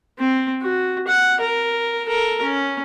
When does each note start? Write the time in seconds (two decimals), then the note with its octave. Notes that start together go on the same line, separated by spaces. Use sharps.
0.19 C4
0.62 F#4
1.07 F#5
1.40 A#4
2.05 A4 A#4
2.42 C#4